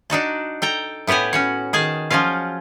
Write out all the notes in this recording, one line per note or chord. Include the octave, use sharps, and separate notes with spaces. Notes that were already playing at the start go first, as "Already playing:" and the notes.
D4 D#4 F#4 A5
A4 G5 A#5
A2 B3 G4 F#5 G#5
C#4 F#4 C#5
D#3 G#4 G#5 A5
F3 F#3 C#4 F4 F5